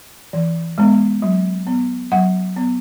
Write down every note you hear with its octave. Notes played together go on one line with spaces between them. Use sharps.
E3
G#3 B3
F#3
B3
F#3 F#5
B3